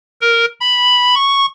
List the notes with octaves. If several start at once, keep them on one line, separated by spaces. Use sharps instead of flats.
A#4
B5
C#6